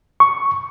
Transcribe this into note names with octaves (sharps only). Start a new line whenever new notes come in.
C#6